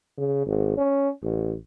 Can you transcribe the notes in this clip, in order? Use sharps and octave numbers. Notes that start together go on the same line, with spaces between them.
C#3
G#1
C#4
A1